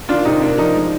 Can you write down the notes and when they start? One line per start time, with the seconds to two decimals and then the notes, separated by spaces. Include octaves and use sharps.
0.09 D#3 D4 F4
0.25 C3 D#4
0.42 A#3 D4
0.58 F3 D#4
0.75 G#3